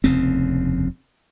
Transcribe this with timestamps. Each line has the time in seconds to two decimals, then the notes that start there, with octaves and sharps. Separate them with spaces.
0.04 F1 D#2 C#3 C4